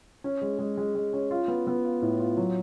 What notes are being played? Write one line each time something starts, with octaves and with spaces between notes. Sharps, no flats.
C#4
G#3
G#3
G#3
G#3
C#4
F4
B3
B3
F4
A2
F4
F#3